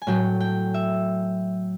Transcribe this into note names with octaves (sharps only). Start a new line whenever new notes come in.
G#5
A2 F#3 A3 G5
G5
E5